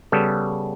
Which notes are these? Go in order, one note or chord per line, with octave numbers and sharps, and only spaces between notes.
C#3 G3 B3 A4